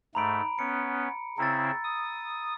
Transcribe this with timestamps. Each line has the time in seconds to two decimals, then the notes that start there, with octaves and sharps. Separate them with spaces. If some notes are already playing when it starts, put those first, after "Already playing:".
0.15 G#2 A3 A#5 B5 D7
0.59 B3 C#4 C#7
1.38 C#3 C4 E4 A#5 E6 A6
1.84 D#6